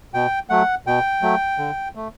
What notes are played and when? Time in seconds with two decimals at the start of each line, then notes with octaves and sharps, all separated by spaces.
0.14 B2 G5
0.50 F#3 A3 F#5
0.87 B2 G5
1.22 F#3 A3
1.58 D3
1.95 A3